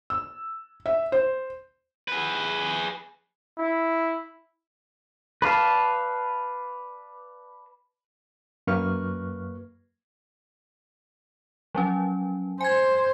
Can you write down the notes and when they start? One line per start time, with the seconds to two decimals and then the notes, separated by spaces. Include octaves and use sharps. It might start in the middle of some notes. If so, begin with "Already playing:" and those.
0.10 E6
0.86 E5
1.12 C5
2.08 G#4 B4
3.59 E4
5.42 B4 D5 F5 A5
8.67 F#2 A#3 B4 C#6 F6
11.75 F3 F#3 C#4
12.61 C5 G#5 G#6